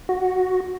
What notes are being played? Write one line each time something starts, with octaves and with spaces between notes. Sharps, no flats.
F#4